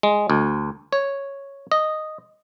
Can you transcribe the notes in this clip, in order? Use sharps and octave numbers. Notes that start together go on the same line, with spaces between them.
G#3
D2
C#5
D#5